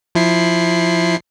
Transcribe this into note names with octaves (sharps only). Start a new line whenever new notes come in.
F3 E4 C7